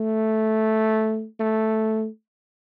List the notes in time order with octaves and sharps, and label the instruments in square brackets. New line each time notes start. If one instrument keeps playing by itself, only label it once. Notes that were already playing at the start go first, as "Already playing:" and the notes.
Already playing: [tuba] A3
A3